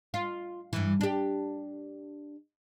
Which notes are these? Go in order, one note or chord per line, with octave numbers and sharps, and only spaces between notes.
F4
G2 E3
D4 G4